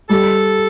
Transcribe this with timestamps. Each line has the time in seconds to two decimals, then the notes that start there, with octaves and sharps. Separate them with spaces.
0.09 G3 A4